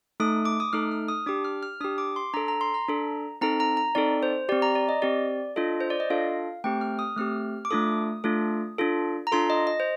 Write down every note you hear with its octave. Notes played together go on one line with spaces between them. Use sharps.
A3 D#4 A4 D#6
D6
D#6
A3 D#4 A4 F6
F6
D#6
D4 G4 D6
F6
F6
D4 G4 D#6
D6
C6
D4 A4 A#5
A#5
C6
A#5
D4 A4
C4 D#4 A4 A#5
A#5
A#5
C4 D#4 A4 D5
C5
C4 G4 D5
A#5
D5
D#5
C4 G4 D5
D4 F4 A4 D#5
C5
D5
D#5
D4 F4 A4 F5
A3 C4 G4 G5
F6
D#6
A3 C4 G4 F6
D6
A3 D4 F4 A4 D#6
A3 D4 F4 A4
D4 F4 A4
A#5
D4 F4 A4 C6
D#5
D#5
C5